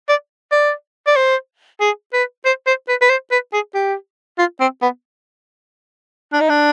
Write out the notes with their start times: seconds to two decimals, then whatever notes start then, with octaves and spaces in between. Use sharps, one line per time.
0.09 D5
0.52 D5
1.07 D5
1.16 C5
1.81 G#4
2.13 B4
2.46 C5
2.67 C5
2.88 B4
3.02 B4
3.10 C5
3.31 B4
3.53 G#4
3.75 G4
4.38 F4
4.60 C4
4.82 B3
6.33 D4
6.41 D#4
6.49 D4